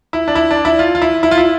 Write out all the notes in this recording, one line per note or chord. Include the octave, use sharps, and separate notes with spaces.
E4
D4
E4
D4
E4
F4
F4
E4
E4
F4
E4